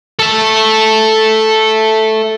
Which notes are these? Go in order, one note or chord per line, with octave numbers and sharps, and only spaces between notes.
A4 E5